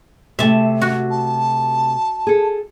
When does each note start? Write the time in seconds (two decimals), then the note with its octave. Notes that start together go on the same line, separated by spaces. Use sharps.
0.39 C3 A3 E5 A5
0.81 F#4
1.10 A5
2.27 G#4 A4